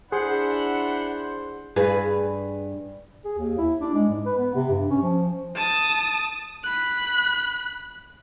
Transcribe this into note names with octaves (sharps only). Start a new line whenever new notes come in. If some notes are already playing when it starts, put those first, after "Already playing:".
D4 E4 G#4 C5 F#5
G2 G#4 B4
G#4
D#2
E4
D4
G#3
G#2
B4
B3
C3
G2
C#4
F3
A5 D#6
B5 F#6